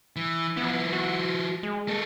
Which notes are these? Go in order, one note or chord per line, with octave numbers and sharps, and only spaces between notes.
E3
F3 B3 E4
F#4
G#3
A#3 A4